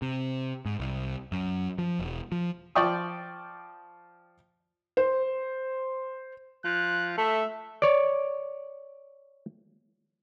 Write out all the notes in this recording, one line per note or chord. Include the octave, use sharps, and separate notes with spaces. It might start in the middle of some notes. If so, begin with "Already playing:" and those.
C3
G#2
C2
F#2
F3
E1
F3
F3 D5 G5 C#6 D#6
C5
F3 F#6
A3 E5
C#5 D5